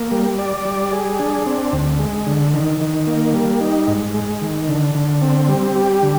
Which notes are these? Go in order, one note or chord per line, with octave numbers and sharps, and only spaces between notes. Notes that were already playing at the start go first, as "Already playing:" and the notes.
Already playing: A#3
G3
D5
G3
G#4
D4
C4
D2
G#3
D3
D#3
D#3
A#3
G3
D#4
G#2
G#3
D#3
D3
D3
C4
G3
G4
D3